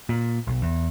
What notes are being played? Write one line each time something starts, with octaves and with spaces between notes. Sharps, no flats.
A#2
B1
E2